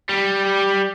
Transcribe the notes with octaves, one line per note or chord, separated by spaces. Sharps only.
G3